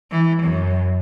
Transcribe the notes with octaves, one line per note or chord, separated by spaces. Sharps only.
E3
F#2